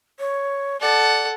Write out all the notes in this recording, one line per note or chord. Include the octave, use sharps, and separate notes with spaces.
C#5
A4 D5 F#5